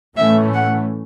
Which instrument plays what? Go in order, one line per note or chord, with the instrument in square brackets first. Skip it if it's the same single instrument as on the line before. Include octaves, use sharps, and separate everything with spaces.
[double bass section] A2 E3 A3 C#4 [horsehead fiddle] E5
[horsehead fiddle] F#5